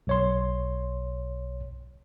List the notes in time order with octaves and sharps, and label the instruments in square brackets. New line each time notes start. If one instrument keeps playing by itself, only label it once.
[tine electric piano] B1 C#5 C6